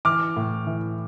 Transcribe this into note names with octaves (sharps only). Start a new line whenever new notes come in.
E3 D6 F6
A2
E3